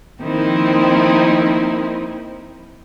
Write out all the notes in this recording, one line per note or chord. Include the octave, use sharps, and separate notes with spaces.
D#3 F3 A#3 C4 D#4 E4